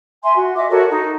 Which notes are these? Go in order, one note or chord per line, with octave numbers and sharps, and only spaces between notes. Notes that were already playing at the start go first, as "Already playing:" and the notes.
E5 G#5 C6
F#4
D#5 E5 D6
F#4 A4 A#4 C#5
D#4